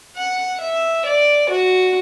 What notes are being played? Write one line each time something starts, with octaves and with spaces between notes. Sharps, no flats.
F#5
E5
D5
F#4